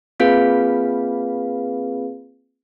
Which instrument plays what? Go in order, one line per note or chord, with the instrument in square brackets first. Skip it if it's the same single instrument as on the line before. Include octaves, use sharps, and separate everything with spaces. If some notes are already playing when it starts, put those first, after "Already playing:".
[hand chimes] A#3 C4 F4 G#4 B4 F5